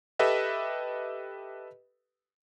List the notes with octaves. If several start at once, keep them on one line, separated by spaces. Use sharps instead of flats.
G4 A4 B4 D#5 E5